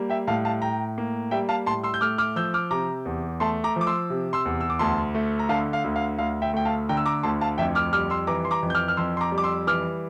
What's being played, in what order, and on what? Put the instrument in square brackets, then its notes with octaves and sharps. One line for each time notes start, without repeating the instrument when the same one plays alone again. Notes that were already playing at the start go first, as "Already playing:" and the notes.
Already playing: [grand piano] G3 A#3
E5 G5
A2 F5 A5
F5 A5
A2 G5 A#5
A#3
G3 E5 G5
F5 A5
A2 A5 C6
C6 E6
G6
A3 D6 F6
D6 F6
F3 E6 G6
D6 F6
C3 A#5 D6
E2
A3 A5 C6
A#5 D6
F3 D6
C6 E6
C3
C6 E6
E2
E6
D6
D2 A5 C6
A3
A#5
D3 F5 A5
F5
D2
F5
D2 F5
E5 G5
A3 G5
F5 A5
D3 G5 A#5
E6
A#5 D6
D2 A5 C6
F5 A5
F2 E5 G5
D6 F6
G3 D6 F6
C6 E6
E3 A#5 D6
C6
A#5 D6
F2
G6
D6 F6
F6
F2 C6 E6
C6
A#5 D6
G3
D6
C6 E6
E3 D6 F6